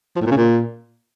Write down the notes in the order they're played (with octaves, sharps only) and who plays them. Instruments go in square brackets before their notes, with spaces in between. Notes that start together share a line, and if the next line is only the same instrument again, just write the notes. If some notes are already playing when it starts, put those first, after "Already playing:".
[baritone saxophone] F3
A2
A#2
C#3
A#2